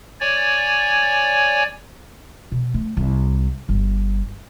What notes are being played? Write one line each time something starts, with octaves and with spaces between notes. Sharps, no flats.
C#5 D5 G#5
B2
A3
C2
G1